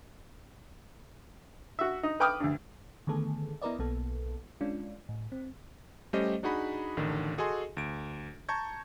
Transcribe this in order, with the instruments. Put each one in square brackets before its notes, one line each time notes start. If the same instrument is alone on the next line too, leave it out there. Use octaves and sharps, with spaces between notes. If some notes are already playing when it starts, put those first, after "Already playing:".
[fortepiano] F#4 E5
D#4
B4 G5 D6 D#6 F6
D2 G2
[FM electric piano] D3 D#3 A3 B3 G#4 A4
B3 E4 A#4 B4 D5 D#5
B1 A#3 B3 A4
G#3 C#4 D4 F4
A2
C4
[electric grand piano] G3 A3 C#4 G4 C5 D#5
D4 D#4 F#4 G#4 F#5 B5
A1 D3 D#3
F#4 G#4 A4 D#5 G#5 C6
D2 D7
A5 A#5 C#6 G6 G#6